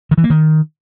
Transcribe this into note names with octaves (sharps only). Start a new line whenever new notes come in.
D#3
E3
A#3
D#3